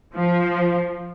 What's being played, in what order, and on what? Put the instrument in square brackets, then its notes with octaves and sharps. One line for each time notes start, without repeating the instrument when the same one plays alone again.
[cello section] F3